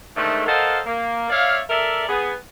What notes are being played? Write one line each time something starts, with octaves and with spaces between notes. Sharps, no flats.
G#2 D3 D#3 A3
A4 A#4 C5 D#5 F5 F#5
A#3
C#5 D5 E5 F5
A4 A#4 D5 E5
B3 G#4